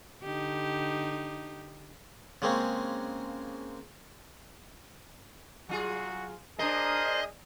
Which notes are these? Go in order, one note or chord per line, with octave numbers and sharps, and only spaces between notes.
D3 D#4 G4
C#3 G#3 A#3 C4 C#4
F#3 F4 F#4 G#4
D4 G#4 A#4 C5 D#5